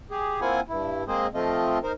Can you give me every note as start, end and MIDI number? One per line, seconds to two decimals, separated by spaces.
0.11 0.40 67
0.11 0.40 68
0.41 0.60 58
0.41 0.60 60
0.41 0.60 64
0.41 0.60 65
0.41 0.60 78
0.41 0.60 80
0.69 1.04 43
0.69 1.04 64
1.08 1.27 56
1.08 1.27 58
1.08 1.27 60
1.08 1.27 68
1.08 1.27 72
1.08 1.27 75
1.34 1.79 53
1.34 1.79 57
1.34 1.79 60
1.34 1.79 65
1.34 1.79 75
1.83 1.92 63
1.83 1.92 70
1.83 1.92 72